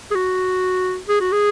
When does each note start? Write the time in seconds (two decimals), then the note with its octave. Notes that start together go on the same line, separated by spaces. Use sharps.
0.11 G#4
0.15 F#4
1.09 G#4
1.21 F#4
1.32 G#4